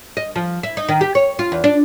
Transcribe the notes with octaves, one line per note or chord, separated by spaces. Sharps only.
D#5
F3
E4
D#4
D#3
G4
C#5
F4
E2
D4